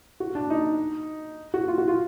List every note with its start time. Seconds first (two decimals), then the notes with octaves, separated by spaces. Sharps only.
0.20 F#4
0.35 D4
0.50 D#4
1.54 F#4
1.68 F4
1.78 F#4
1.88 F4